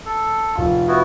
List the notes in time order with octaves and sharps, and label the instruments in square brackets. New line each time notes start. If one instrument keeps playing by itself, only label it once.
[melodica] A4
[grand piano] F1 F4
[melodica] B3 E4 F#4